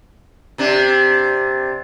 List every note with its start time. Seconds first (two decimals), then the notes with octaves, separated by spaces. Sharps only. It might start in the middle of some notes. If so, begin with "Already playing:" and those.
0.58 C3 D4